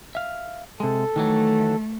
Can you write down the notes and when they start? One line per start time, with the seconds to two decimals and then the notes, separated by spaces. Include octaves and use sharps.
0.15 E5 F5
0.80 C3 G#3 A4
1.16 D#3 E3 F#3 A3